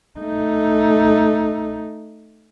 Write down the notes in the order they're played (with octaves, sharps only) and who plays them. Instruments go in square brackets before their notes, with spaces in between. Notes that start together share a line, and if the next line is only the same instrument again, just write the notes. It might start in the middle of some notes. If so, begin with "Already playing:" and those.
[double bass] A3 D#4